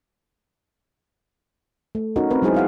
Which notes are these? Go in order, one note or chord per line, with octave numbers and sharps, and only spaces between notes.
A3
C#4 D#4 F#4 A#4
C4 A#4 B4
F#3 G#3 D#4 E4 G#4 C5
E4 F5 F#5